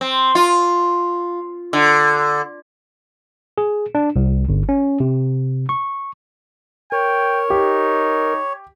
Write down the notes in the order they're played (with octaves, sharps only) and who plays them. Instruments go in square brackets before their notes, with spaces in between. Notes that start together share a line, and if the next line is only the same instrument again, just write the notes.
[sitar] C4
F4
D3
[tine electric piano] G#4
D4
C2
G1
C#4
C3
C#6
[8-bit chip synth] A#4 [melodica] C#5 [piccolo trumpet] G5
[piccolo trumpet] D#4 [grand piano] G4